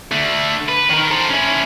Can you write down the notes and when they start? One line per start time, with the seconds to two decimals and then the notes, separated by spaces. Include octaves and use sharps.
0.12 D3 A3
0.69 B4
0.90 D#3 A#4
1.10 A4 C5
1.30 C#4 E4